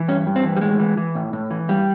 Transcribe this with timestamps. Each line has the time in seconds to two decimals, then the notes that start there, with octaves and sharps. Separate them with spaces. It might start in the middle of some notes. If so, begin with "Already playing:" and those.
Already playing: E3
0.08 G2 C#4
0.26 G2
0.36 C4
0.44 E3
0.57 G3
0.61 A2 G#3
0.79 E3
0.97 E3
1.15 A2
1.33 A2
1.51 E3
1.69 G2 G3